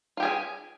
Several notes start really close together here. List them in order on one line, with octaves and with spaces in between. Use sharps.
F4 G4 G#4 G#5